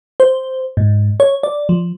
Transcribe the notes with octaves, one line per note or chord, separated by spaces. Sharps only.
C5
G#2
C#5
D5
F3